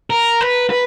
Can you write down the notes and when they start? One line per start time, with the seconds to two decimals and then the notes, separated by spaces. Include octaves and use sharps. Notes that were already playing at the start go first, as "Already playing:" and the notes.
0.10 A#4
0.41 B4
0.70 B4